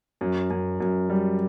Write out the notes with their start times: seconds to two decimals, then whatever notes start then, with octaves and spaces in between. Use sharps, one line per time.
0.21 F#2
0.50 F#2
0.80 F#2
1.10 G3